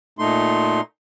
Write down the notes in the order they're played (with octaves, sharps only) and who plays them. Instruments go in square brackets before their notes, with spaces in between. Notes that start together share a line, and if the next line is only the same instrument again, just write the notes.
[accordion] A#2 A3 D#4 C6